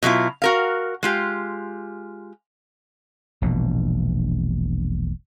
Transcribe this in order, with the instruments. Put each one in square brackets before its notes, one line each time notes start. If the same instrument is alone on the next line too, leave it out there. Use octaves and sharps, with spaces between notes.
[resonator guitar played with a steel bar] B2 F#3 E4 F4
F#4 A#4 F5
G#3 F4 G4
[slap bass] E1 A#1 B2